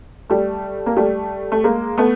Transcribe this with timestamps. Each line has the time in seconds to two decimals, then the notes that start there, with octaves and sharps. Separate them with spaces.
0.30 G3 A3
0.86 A#3
0.97 G3 A3
1.52 A3
1.64 G#3 A#3
1.98 A3 B3